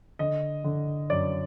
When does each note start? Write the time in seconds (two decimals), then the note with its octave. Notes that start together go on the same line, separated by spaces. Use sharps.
0.19 D3 D#5
0.64 D3
1.10 F#2 D5